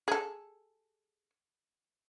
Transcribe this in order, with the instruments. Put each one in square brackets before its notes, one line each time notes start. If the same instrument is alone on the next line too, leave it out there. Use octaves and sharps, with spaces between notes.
[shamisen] G#4 A4